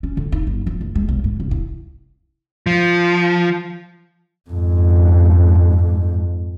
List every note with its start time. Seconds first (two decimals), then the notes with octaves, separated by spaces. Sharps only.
0.03 C#4
0.17 D3
0.32 D#4
0.47 G1
0.66 F3
0.81 F#1
0.95 G#3
1.09 B1
1.24 G#2
1.40 C2
1.51 E4
2.67 F3
4.50 F2 G#2